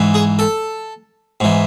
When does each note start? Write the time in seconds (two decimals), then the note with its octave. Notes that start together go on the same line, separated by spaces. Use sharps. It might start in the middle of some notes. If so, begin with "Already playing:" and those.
Already playing: G#2 E3
0.14 G#4
0.39 A4
1.40 G#2 E3